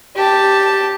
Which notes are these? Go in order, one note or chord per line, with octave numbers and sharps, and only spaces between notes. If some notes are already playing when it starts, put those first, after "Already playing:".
G4 A5